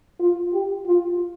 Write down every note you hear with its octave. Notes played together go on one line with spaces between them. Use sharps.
F4
G4
F4